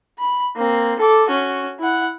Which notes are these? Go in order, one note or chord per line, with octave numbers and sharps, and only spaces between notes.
B5
A#3 C4
A4 D6
C#4 F#4
E4 F#5